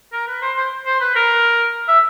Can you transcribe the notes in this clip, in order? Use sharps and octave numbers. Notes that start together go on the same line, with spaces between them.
A#4
B4
C5
C5
C5
B4
A#4
E5